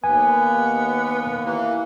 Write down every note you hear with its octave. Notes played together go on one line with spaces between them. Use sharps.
D#2 B3 G#5
E3 A#3